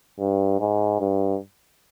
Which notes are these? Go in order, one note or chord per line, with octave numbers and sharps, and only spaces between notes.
G2
G#2
G2